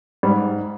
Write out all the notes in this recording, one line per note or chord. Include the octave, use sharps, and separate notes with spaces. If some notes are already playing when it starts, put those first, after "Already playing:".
G#2 G3